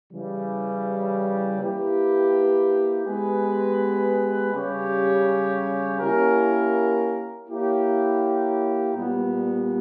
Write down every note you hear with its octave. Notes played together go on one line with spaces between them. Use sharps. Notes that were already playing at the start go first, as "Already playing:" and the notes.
C#3 E3 G3
A#3 E4 G4 B4
G#3 B3 G4 B4
C#3 G3 C#4 G4 C#5
A#3 C#4 E4 G4 A#4
A#3 E4 G4 C#5
A#2 G3 B3